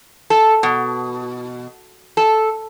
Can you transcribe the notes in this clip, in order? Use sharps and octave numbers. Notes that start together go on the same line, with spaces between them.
A4
B2
A4